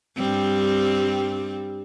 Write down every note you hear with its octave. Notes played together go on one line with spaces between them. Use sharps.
G2 G3 C4